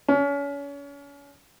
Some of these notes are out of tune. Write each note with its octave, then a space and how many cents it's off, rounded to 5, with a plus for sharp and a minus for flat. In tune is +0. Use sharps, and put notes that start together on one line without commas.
C#4 +35